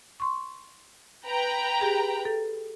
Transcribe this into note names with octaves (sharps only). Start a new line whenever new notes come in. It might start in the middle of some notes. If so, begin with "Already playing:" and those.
C6 C#6
B4 G5 A#5
G4 G#4
A4